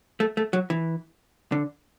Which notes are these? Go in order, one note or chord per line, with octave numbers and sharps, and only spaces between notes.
A3
A3
F#3
E3
D3